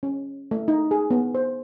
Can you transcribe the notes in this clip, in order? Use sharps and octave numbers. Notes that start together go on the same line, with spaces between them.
C#4
A3
D#4
G#4
B3
C5